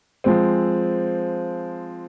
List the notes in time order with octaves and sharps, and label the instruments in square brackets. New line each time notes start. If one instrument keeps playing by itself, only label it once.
[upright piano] F3 G#3 C4